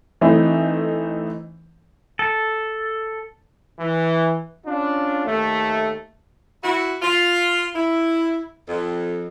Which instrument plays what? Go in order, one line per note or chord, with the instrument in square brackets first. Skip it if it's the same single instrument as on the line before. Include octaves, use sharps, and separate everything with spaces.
[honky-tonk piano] E3 A3 C4 D#4
[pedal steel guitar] A4
[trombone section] E3
C#4 D4 F4
D#2 A3
[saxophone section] E4 F#4
F4
E4
F2